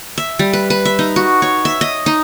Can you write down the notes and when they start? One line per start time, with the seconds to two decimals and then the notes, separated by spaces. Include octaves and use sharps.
0.18 E5
0.39 G3
0.53 B4
0.70 B4
0.85 E5
0.99 D#4
1.16 F#4
1.42 C#5
1.65 E5
1.81 D#5
2.06 D#4